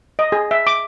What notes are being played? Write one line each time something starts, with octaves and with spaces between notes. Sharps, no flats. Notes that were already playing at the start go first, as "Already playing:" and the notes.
D#5
G#4
E5
D6